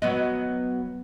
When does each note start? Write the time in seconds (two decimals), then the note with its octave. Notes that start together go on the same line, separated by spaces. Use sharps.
0.02 F#3 B3 D#5